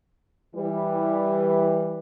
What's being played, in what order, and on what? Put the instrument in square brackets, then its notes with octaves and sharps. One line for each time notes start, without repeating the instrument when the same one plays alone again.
[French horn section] E3 G3